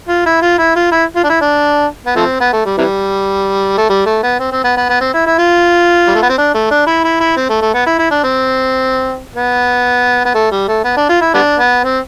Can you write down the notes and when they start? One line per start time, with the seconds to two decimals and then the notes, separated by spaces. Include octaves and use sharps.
0.08 F4
0.26 E4
0.42 F4
0.59 E4
0.75 F4
0.92 E4
1.16 F4
1.24 D4
1.29 E4
1.41 D4
2.06 B3
2.16 F3 A3 C4
2.40 B3
2.53 A3
2.65 G3
2.78 C3 E3 G3
3.78 A3
3.89 G3
4.06 A3
4.23 B3
4.39 C4
4.52 C4
4.64 B3
4.77 B3
4.89 B3
5.01 C4
5.14 E4
5.26 E4
5.38 F4
6.07 G3
6.15 A3
6.22 B3
6.30 C4
6.38 D4
6.54 A3
6.71 D4
6.87 E4
7.04 E4
7.20 E4
7.37 C4
7.50 A3
7.62 A3
7.74 B3
7.86 E4
7.99 E4
8.11 D4
8.24 C4
9.36 B3
10.25 B3
10.35 A3
10.51 G3
10.68 A3
10.84 B3
10.97 D4
11.09 F4
11.21 E4
11.34 G3 B3 D4
11.59 B3
11.84 C4